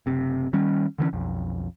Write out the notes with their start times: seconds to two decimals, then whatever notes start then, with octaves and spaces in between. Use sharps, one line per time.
0.06 F#1 C3
0.53 D#3 G3 C#4
0.98 D3 E3 A3 C#4
1.13 B1 F2